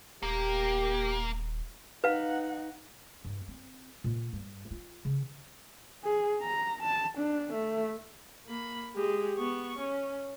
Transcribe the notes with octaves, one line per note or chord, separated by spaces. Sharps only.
D#1 A#3 G4
D#4 B4 F5 F#5
G2
C4
A#2
G2
F4
C#3
G#4
A#5
A5
D4
A3
A#3 B5
G#3 G4
B3 C#6
C#4